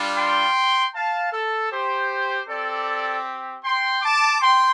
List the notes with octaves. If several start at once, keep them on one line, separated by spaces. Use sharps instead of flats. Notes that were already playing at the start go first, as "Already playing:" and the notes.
Already playing: G3 D4 F4
G5 C6
F5 A5
A4
G4 C5
C4 G4 A4 D5
G5 C6
A5 D6
G5 C6